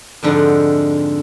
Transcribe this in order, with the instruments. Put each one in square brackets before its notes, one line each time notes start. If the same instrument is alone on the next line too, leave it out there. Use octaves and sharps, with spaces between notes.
[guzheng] F2 G#2 D3 C5 D#5 F#5